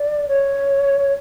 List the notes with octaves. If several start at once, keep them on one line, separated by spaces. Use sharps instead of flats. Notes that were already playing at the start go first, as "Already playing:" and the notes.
Already playing: D5
C#5